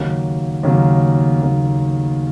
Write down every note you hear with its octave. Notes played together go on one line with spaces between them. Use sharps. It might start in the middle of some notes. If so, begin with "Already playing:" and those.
Already playing: D#2 C#3 F#3 A#3
D#2 C#3 F#3 A#3
D#2 C#3 F#3 A#3